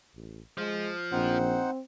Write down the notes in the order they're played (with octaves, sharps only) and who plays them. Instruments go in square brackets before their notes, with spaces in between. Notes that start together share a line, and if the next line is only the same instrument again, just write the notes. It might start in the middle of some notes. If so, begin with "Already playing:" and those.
[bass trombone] A1
[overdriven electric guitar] F3 [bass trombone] G#3
[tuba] A#1 [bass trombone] C4 [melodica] D#4 C5 F#5